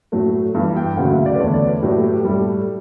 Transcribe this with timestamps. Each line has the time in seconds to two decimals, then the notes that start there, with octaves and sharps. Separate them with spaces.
0.12 A2 F#3 A3
0.55 G2 E3 G3
0.76 G5
0.97 D2 C#3 F#3 A3 F#5
1.11 E5
1.26 D5
1.35 B4
1.40 E2 D3 A3 C#5
1.54 D5
1.68 B4
1.83 A2 F#3 A3 G4
2.04 G4
2.20 G4
2.25 A2 G3 A4